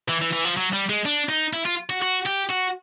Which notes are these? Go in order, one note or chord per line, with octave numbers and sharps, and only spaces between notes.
E3
E3
E3
F3
F#3
G3
G#3
D4
D#4
E4
F4
F#4
F#4
G4
F#4